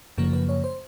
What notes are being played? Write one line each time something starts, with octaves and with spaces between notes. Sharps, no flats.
F#2 C#3 F3 A#3 A#4
B4
C#5
C5